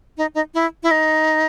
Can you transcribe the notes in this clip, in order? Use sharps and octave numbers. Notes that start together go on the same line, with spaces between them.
D#4
D#4
E4
E4
D#4